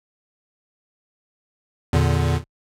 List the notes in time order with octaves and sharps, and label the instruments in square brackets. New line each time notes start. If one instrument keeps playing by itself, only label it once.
[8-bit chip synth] E2 A#2 D3